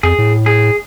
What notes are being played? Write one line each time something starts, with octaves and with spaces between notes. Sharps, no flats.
F2 G#4
A2
G#4